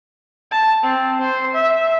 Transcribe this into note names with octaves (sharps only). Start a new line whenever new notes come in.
A5
C4
C5
E5